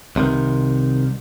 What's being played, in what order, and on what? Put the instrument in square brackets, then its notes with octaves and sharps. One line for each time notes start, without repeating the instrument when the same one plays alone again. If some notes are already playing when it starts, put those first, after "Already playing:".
[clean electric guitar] C2 C3 D#3